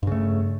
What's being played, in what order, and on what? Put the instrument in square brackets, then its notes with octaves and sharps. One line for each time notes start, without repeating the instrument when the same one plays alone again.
[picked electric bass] G2
C#3
A3